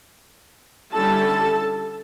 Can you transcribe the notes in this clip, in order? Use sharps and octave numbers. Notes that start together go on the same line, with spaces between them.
D3 G3 C#4 E4 A4 A5